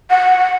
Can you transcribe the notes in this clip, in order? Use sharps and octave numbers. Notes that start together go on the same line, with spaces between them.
F#5